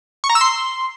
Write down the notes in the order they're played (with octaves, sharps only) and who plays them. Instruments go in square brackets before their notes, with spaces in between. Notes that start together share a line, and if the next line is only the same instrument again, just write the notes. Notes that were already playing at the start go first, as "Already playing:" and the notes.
[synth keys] C#6
A#5
E6
C6